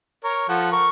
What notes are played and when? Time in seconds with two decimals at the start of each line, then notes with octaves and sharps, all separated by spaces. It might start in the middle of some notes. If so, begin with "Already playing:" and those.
0.24 A#4 C#5
0.49 F3 A4 F#5
0.72 A#4 C#6